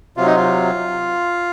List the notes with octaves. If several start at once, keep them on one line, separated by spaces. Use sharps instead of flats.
C3 F#3 F4
D#4
F4